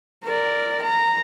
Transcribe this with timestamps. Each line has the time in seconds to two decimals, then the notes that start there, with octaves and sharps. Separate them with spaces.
0.24 A#4 D5
0.82 A#5